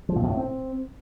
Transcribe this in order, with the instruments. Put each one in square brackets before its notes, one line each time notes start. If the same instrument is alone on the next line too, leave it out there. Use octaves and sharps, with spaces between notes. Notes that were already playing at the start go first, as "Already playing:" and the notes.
[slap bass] F3
A#2
B2
A2
C4